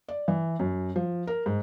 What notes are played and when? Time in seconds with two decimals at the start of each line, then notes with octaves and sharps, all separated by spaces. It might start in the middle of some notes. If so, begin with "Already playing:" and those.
0.09 D5
0.28 E3
0.59 F#2
0.96 F3
1.27 A#4
1.46 G#2